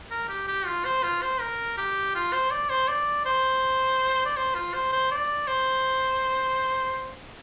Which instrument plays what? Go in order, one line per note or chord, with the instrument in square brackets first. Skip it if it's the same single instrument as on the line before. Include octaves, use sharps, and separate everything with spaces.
[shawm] A#4
G4
G4
F4
C5
F4
C5
A#4
G4
F4
C5
D5
C5
D5
C5
D5
C5
F4
C5
C5
D5
C5